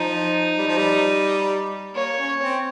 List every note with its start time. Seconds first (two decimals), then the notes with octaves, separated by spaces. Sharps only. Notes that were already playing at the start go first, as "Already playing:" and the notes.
Already playing: F3 D#4
0.58 G3
0.67 F3
0.77 G3
1.94 A#3 C#5
2.18 C#4
2.41 C4